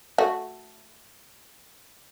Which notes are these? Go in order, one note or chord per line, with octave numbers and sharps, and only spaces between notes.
A3 F#4